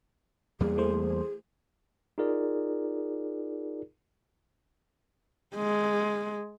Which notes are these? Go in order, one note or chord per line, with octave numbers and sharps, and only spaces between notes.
E2 G3 A#3 G#4
E3 A3 C5
D#4 F4 G#4 A#4 D5
G#3